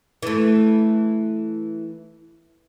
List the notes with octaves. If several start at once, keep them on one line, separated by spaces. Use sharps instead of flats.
E3 A3